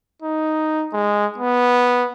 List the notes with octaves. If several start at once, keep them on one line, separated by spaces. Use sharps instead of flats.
D#4
G#3
B3